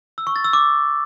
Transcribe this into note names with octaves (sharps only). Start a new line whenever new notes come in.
E6
C#6
A6
E6
D6